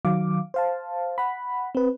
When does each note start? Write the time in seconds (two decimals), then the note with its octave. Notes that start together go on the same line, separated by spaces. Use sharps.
0.05 D#3 F#3 F5 D6
0.54 C5 F5 A5
1.18 F#5 B5
1.75 C4 B4